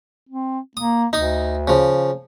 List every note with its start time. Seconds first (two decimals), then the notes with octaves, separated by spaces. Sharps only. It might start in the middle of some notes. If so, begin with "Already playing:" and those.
0.29 C4
0.77 A#3 D#6
1.13 D2 D#4 D#6
1.68 C#3 F3